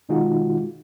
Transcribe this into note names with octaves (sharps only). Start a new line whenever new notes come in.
B2 D#3 G#3 D#4 F4 F#4